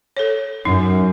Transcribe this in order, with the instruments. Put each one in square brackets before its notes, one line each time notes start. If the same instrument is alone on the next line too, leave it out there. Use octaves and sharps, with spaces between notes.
[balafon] A4 C#5
[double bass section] F#2 [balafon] D#4